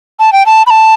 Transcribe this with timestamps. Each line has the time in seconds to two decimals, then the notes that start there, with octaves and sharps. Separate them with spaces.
0.19 A5
0.32 G5
0.46 A5
0.66 B5
0.70 A5